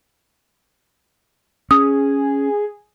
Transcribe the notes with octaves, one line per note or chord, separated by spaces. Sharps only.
C#4 G#4 D#6